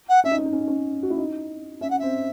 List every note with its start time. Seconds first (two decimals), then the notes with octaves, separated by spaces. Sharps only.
0.08 F#5
0.24 C#4 E5
0.31 D#4
0.39 C#4
0.46 D#4
0.53 C#4
0.61 D#4
0.68 C#4
1.03 F#4
1.10 E4
1.18 D#4
1.81 C#4 E5
1.90 F#5
1.98 C4 E5